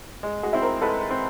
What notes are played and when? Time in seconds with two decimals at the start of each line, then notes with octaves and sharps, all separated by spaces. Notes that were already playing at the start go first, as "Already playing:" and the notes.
0.23 G#3
0.43 F#4 G#4
0.53 C4 E4
0.62 A#4 C5
0.81 G#3 A4 B4
1.10 C4